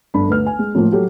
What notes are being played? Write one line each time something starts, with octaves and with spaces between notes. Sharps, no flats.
G1 D4 B5
D2 B4 F6
G#5
G#3
A2 F3 A#3 F4
F#3 G4 A4